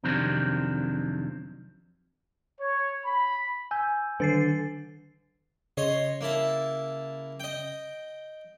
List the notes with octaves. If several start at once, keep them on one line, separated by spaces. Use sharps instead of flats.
F2 C3 D#3 F#3 C4 D4
C#5
B5
G#5 E6 G6
D3 D#3 A6 C7
C#3 C#5 D#5 C6
A#3 E4 A5
D#5 G5